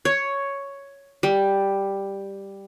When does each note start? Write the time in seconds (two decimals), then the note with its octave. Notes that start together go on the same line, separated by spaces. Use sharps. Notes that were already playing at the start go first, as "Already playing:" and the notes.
0.05 C#5
1.23 G3